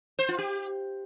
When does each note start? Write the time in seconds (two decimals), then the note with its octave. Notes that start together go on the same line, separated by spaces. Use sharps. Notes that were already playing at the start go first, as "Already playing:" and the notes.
0.19 C5
0.29 F4
0.39 G4